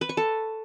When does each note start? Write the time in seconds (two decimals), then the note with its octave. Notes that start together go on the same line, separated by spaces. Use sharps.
0.01 B4
0.09 C#6
0.17 A4